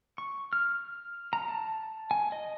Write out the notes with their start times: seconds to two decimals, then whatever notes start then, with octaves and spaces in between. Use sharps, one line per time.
0.18 C#6
0.53 F6
1.33 A#5
1.48 A5
2.11 G#5
2.32 D#5